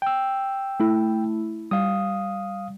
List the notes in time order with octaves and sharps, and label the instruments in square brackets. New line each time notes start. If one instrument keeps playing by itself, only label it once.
[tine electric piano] G5 E6
[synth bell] A3 E4
[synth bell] G3 [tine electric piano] F5 D#6